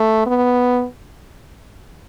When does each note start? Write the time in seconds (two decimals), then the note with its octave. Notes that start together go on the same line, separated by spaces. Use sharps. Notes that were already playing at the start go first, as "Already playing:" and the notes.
Already playing: A3
0.26 B3